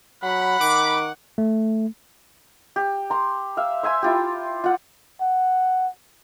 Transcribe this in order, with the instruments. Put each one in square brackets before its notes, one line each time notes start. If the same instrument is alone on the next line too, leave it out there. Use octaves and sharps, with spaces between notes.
[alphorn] F#3 [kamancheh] F#5 [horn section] B5
[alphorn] D#3 [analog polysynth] D6
[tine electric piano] A3
[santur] G4
A#5 C6
E5 F5
C5 E5 G#5 C6
E4 F4 G4
F4 F#5
[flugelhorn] F#5